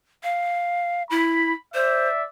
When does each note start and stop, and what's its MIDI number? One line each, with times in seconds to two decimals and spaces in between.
0.23 1.03 77
1.10 1.53 64
1.10 1.55 83
1.74 2.08 72
1.74 2.24 74
1.74 2.24 76